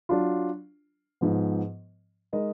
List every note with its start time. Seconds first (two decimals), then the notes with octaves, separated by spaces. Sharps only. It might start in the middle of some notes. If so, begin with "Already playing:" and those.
0.09 F#3 D4 F4
1.21 G#2 F3 B3
2.33 G#3 D#4 A#4 D#5